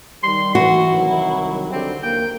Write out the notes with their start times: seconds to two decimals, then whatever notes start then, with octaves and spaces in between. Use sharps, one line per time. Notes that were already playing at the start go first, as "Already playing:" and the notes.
0.23 D#3 G3 C6
0.55 E3 E4 F#4
0.93 C2 D#3 F#3
1.71 D3 C4 G4
2.03 D#2 A#3 G5